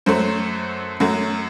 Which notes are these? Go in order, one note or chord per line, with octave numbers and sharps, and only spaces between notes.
F#2 F#3 A3 C5
F#2 F#3 A3